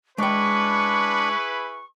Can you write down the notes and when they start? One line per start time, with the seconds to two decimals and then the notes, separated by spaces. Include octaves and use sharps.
0.18 G#3 D4 E4 G#4 B4 G5 C#6